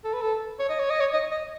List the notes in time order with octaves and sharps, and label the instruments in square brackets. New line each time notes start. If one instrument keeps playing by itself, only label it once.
[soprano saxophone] A4
B4
A4
C#5
D#5
C#5
D#5
C#5
D#5
D#5